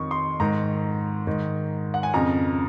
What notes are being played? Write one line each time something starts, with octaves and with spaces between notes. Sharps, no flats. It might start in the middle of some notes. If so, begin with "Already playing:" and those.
Already playing: F2 D#3 C#6
C6
G#2 D#3 A#5
G#2 D#3
F#5
G#5
F2 C#3 A#5